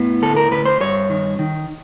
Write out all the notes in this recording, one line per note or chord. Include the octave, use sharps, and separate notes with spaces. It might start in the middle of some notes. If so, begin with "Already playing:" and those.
Already playing: A2 B3
D2 A4
A#4
D2 B4
C5
G2 C#5
D#3
D#3